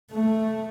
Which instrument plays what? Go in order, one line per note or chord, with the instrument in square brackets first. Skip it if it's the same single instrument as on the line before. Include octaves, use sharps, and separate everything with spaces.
[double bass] A3